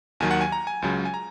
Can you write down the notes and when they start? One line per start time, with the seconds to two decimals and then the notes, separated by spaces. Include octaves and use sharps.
0.20 D#2 D#3 F#3 G#5
0.31 F#5
0.41 G#5
0.52 A#5
0.67 G#5
0.82 C#2 C#3 F#3
1.05 G#5
1.14 A#5